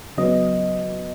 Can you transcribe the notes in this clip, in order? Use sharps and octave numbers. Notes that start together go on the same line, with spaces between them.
C#3 F#3 B3 D#5